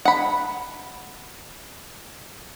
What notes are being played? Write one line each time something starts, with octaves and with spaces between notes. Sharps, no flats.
F#5 B5